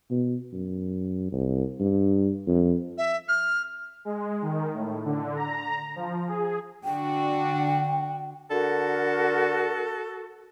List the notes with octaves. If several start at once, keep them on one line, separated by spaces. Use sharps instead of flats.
B2
F#2
C2
G2
F2
E5
F6
G#3
D#3
A2
D3
A#5
F3
G#4
D3 D4 F#4 G5
D3 F#4 A4 A#4